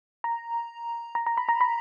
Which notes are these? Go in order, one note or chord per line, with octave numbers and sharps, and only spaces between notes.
A#5
A#5
A#5
B5
A#5
B5